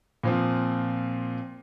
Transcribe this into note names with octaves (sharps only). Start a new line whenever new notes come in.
A#2 F3 C4